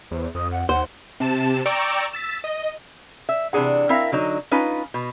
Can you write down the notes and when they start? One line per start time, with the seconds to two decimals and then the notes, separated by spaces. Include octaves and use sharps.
0.11 E2 C5
0.35 F2 D#6
0.52 F#5
0.69 D#2 C5 F#5
1.20 C3 A5 E7
1.66 D5 G5 A#5 C#6 D6 E6
2.13 E6 A6 B6
2.44 D#5
3.29 E5
3.53 C3 E3 D4 G#4 F#5
3.89 C4 E4 A#4 E5 F5
4.12 D3 F#3 D#4
4.51 C#4 D#4 F4 B4
4.94 B2